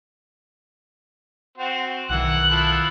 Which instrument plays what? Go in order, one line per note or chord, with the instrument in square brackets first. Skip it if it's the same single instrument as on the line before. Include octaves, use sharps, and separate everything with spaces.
[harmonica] C4 F#4 C5
[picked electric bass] B1 D#3 [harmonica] E3 F#5 [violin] F#6
[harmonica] F3 E4 A4